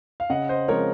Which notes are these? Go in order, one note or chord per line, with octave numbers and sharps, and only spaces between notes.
F5
C#3 D#5 F#5
C5 D#5
F3 G#3 C4 A#4 C#5